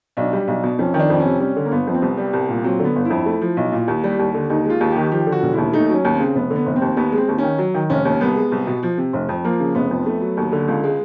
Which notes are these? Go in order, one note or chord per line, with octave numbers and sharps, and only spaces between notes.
B1 D4
G3
B1
B2
F2 C#4
D#3
D4
F2
C#4
C3
G3 C#4
D3
A#3
G1 B3
F2
C4
C2 B3
G3
C2
A#2
F#3 C4
D3 B3
G1
F2 E4
A3
F3
B1
A#2
D#2
G3
D#2
D3
D#2 D#4
G#3 F4
D#2
D#3 G4
F3 G4
D3
F#4
E1
D#2 E4
A3 D#4
F#3 C#4
D#2
C4
C#3
F1 B3
D3
B3
F1
C4
D#2
D#2 B3
G#3
C4
D#2
D#3 C#4
F#3
D#3
F1 C#4
D#2
C2 B3
G#3
C2
B2
F3
C3
F1
F2
F3 A#3
C#3
F1 B3
F2
A3
F#3
D#2
D3
C#2
G#3